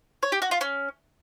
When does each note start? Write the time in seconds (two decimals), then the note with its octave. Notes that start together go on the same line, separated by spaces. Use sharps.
0.23 C#5
0.32 G4
0.42 F#4
0.51 F4
0.61 C#4